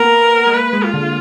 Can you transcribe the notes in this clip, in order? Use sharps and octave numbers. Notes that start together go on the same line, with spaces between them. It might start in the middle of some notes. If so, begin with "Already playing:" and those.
Already playing: A#3 B3 A#4
G#3
A#3 B4
G#3
F4
D3